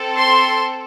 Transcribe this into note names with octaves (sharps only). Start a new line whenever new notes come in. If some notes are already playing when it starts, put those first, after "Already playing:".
Already playing: C4 A4
C6